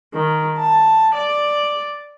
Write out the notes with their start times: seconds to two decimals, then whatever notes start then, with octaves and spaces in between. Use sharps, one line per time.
0.14 D#3
0.59 A5
1.15 D5